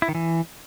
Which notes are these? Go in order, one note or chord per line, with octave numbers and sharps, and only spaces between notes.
E4
D#3
E3